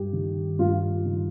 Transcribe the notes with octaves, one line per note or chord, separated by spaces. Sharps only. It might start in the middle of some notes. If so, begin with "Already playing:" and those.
Already playing: G2 G4
D#3
G2 F4
D#3